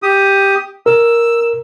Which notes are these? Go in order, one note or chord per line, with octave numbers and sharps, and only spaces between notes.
G4 D#6
A#4 E6